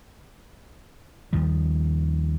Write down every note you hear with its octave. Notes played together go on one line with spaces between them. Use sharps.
D#2 D#3 F3 G3